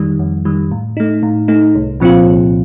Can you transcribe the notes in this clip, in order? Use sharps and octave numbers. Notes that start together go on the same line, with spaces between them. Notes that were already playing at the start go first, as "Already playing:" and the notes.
Already playing: F2 D#3 G3
F2
D#3 G3
A2
A3 D#4
A2
A3 D#4
C2
A#2 F3 C4 F4
C2